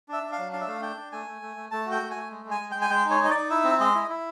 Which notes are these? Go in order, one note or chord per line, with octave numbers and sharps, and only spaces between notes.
D4 E5
D4
F5
F#3
D4 F5
E5
A3 F5
D4 G5
D4
A3 G#5
A3
A3
A3
A3 A5
F#4
G5
A3
G#5
A3
G#3
G#3
G#5
G#3
G#3 G5
G#5
G#3 G5
D#4
C#5
D#4 D#5
D#4 D5
E4 E5
C4
G#3 D#5
E4
E4